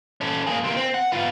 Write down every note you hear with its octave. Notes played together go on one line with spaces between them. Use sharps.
C#4 A4
A#3 G#4
C3 A#3
C4
F#5
B3 F4